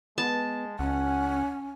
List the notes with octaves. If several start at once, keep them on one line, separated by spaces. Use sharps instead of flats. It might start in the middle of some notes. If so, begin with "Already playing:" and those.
G#3 B3 A5
C#2 C#4 F#5